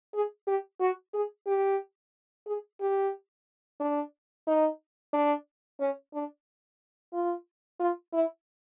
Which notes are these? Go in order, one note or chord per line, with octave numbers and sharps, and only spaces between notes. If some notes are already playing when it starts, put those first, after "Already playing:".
G#4
G4
F#4
G#4
G4
G#4
G4
D4
D#4
D4
C#4
D4
F4
F4
E4